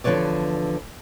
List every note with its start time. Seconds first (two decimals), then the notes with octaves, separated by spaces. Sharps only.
0.04 E2 D3 F3 B4 C#5 D5